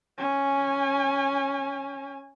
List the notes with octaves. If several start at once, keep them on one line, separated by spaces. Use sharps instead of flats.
C#4 G#5